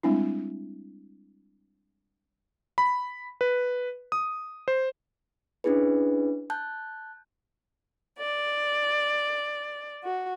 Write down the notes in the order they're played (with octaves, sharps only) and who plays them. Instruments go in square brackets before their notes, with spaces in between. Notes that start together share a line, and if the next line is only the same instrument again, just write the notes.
[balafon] G3 G#3 C4 D4 E4
[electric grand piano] B5
B4
D#6
C5
[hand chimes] C#4 D4 E4 G#4 B4
A5 F#6 G6
[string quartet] D5
F#4